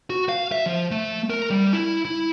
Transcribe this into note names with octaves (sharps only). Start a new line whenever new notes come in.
F#4
F5
E5
F3
A3
A#4
G3
E4
E4